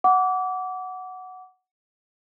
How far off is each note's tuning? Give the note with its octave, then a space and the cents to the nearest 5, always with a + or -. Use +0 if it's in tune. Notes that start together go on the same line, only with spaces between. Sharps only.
F#5 +0 D6 -25